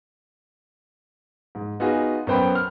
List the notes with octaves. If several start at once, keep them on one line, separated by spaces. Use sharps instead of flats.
G#2
B3 D#4 F4 F#4 G#4
F#2 B3 C5 G5 B5
F6